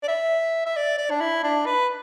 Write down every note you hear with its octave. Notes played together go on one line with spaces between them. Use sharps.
D5
E5
E5
D5
D5
D4
E4
D4
B4